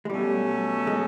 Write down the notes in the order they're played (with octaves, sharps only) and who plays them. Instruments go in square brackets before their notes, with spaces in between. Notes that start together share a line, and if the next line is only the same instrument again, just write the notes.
[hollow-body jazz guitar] G#3
[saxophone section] B2 F#3 A3 C#4 [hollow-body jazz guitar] G3
[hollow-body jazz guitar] G#3